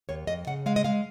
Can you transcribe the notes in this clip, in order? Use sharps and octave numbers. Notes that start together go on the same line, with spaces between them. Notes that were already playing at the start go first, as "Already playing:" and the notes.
D#2 C#5
F2 D#5
C#3 F#5
G#3 F5
D#5
G#3 F5